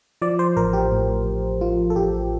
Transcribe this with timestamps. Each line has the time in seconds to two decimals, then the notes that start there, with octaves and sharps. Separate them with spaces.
0.22 F3 D5
0.39 C5
0.56 A1 A#4
0.73 G4
0.91 A2
1.26 A1
1.61 F3 F4
1.90 A4
1.95 A1 G4